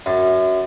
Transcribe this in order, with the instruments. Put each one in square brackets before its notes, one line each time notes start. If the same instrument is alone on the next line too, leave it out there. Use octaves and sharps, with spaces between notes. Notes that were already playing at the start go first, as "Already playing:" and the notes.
[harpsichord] F#2